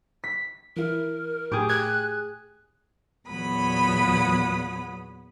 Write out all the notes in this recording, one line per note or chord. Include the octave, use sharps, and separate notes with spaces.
B6
E3 E4 A#4
A2 G4 G#4
F#6 G#6
E2 A#2 F#3 B3 B5 D#6